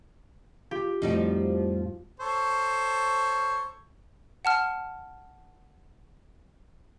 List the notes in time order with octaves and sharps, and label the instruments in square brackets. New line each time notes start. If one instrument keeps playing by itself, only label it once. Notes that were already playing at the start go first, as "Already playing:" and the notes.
[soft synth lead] F4 [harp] G4
[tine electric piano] F2 A2 F#4 [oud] F3 G3 D#4
[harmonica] A4 C5 C#5
[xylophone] F#5 A5 F6